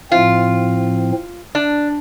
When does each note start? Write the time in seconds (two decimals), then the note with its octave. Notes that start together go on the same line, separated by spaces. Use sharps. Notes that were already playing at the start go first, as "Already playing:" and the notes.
0.11 A2 F3 C4 F4
1.55 D4